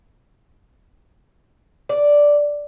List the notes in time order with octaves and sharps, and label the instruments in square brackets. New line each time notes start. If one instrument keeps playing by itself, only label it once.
[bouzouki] D5